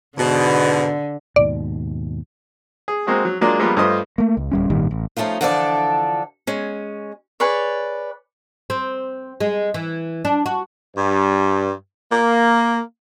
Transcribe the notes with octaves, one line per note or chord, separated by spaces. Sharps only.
G#2 B2 D3
D#2 G#2 B2 D5
G#4
G#3 A#3 C4 F#4 G#4
F#3
F#3 G#3 A#3 D4 F4 D5
F3 G3 G#3 A#3 B3 F4
G2 A3 F4 C5 D#5 D#6
A3 A#3
C#2
D1 G3 C#4
G#1 A#2 D#3 G3
A1
F3 A3 C#4 D#4 F4
D3 E3 F3 D4 A4 D5
G#3 C#4
G#4 B4 C#5 D5
C4
G#3
E3
D4
F#4
G2
A#3